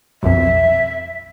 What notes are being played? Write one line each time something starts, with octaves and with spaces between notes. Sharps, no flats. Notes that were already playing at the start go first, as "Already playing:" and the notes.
B1 F2 E5